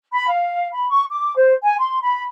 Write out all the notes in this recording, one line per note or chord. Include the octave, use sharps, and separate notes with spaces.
B5
F5
B5
C#6
D6
C5
G#5
C6
B5